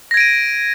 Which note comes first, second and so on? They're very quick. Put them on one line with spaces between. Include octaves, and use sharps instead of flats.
A#6 G#6 D7 D#7